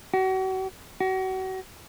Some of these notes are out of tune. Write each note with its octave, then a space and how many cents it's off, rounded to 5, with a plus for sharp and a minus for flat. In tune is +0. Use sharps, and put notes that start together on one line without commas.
F#4 +35
F#4 +35